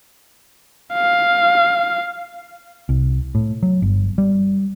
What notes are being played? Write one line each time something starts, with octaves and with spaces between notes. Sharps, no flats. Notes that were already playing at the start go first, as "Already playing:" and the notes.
F5
C2
A2
F#3
G1
G3